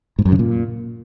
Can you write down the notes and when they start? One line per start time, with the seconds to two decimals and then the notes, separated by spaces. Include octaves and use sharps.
0.19 G#2
0.25 F#2
0.32 C#3
0.39 A#2